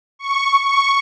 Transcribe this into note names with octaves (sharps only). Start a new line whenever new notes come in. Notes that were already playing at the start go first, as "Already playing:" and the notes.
C#6
C#6